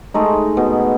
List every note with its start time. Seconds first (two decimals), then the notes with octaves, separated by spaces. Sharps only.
0.14 G#3 A3 D#4
0.57 B2